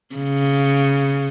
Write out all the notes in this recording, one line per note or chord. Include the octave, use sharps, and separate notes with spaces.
C#3